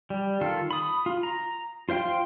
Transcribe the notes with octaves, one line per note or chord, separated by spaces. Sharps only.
G3
D#3 F4 A4
B5 D#6
F4
A#5
F4 C5 F5 G5 C6